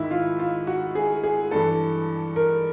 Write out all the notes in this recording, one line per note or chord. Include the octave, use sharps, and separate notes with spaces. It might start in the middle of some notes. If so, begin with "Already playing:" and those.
Already playing: G#2 D#3 E4
F4
F4
F#4
G#4
G#4
G2 E3 A4
A#4